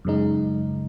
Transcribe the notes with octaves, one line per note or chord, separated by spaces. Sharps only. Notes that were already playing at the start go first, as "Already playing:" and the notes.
F#2 C#3 G#3 D#4